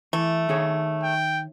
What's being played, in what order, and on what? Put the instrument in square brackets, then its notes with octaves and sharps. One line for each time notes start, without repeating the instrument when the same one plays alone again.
[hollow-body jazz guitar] E3 [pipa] A3
[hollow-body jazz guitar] D#3 G#4 C#5
[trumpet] G5